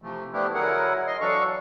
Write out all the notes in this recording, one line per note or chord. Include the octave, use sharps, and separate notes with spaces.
C3 E3 F3 A3
F3 A3 B3 D4 E4 G4
D3 F#3 E4 G#4 A#4 F#5
D#5 C6
E3 F#3 D4 A4 F5 C#6